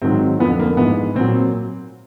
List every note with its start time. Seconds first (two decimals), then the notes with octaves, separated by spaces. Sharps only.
0.02 G#2 D#3 F#3 C4
0.39 F2 D3 F3 B3
0.59 A#3
0.77 G#2 E3 B3
1.15 A#2 F#3 C4